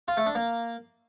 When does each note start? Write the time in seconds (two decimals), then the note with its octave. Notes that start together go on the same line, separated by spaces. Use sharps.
0.08 F4
0.17 A3
0.26 D4
0.35 A#3